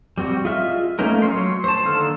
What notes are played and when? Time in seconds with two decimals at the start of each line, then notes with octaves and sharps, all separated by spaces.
0.18 G3 C4 F#4
0.45 F4 G#4 D#5 E5 F6
0.99 A3 A#3 C#4 D#4 A#4
1.22 F#3 C#5 C6
1.64 C5 A5
1.85 D3 D#3 A#3 A4 F6